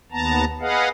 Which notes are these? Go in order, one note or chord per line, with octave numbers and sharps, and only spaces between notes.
D#2 B3 A5 A#5
G#4 B4 D#5 F5 F#5